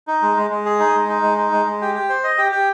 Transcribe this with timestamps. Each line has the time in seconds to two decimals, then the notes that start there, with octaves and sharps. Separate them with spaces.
0.08 D#4
0.22 G#3
0.37 G#3
0.51 G#3
0.66 G#4
0.80 D#4
0.95 G#3
1.09 D#4
1.22 G#3
1.38 D#4
1.52 G#3
1.66 G#3
1.81 G4
1.95 G4
2.09 C5
2.24 D#5
2.38 G4
2.52 G4